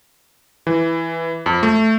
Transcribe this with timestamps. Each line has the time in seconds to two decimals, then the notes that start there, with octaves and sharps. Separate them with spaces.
0.67 E3
1.46 F2
1.63 A3